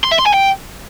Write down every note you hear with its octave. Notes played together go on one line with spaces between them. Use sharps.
C6
E5
C6
G#5
G5